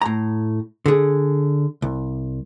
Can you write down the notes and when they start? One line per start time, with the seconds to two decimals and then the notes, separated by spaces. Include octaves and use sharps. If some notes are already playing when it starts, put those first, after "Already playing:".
0.02 A2 A#5
0.86 D3 G#4
1.82 C2